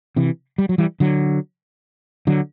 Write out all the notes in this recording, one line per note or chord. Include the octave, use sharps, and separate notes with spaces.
C3 E3
G3
F#3
E3 G3
D3 F#3
D3 F#3